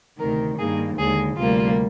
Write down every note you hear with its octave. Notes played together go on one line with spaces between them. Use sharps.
D2 C3 D#3 A#4
G2 D#3 A#3 G#4
D#2 D3 G#3 G#4
D2 C3 G3 A#3 F4